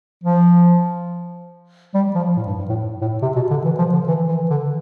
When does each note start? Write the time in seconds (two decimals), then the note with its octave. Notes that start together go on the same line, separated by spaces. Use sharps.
0.24 F3
1.95 G3
2.15 F3
2.37 A2
2.47 G2
2.59 G2
2.69 A2
3.01 A2
3.22 C3
3.36 B2
3.51 D3
3.65 E3
3.79 F3
3.93 D3
4.08 E3
4.29 E3
4.50 D3